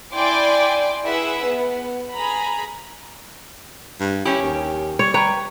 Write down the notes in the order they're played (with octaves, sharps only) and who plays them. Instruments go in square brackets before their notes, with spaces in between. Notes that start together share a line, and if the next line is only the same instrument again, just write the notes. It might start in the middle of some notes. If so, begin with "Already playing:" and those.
[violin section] E4 D5 G5 G#5 C6 D6
E4 G#4 B4 E5 F#5
B3
G#4 A#5 B5
[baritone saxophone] G2
[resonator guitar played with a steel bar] C#4 G4 [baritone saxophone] E4
[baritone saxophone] D#2
[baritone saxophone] G3 [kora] C#5
[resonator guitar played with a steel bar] B4 G5 A#5 [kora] C#5